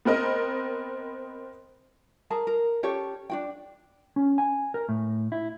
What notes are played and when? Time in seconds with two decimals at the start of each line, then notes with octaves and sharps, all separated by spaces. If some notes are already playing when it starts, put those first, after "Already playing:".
0.05 B3 C4 A#4 D#5
2.30 G#4 A#4 A5
2.47 A#4
2.83 C#4 G4 A4 C#5
3.30 D4 F#4 G5
4.16 C#4
4.38 G#5
4.74 A#4
4.89 A2
5.32 E4